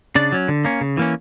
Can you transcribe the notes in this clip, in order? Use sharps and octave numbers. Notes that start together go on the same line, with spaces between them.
C#3 D4 D5
F#3 C#4
D3
A#3 C#4
C#3
E3 A#3 C#4